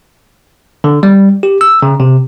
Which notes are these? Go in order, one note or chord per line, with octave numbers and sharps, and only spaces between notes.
D3
G3
G4
E6
C#3
C3